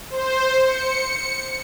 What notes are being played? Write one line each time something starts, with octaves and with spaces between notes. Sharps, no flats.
C5
C#7